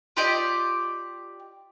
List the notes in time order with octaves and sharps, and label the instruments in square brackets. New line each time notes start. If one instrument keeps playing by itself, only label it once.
[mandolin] F4 G4 D5 D#5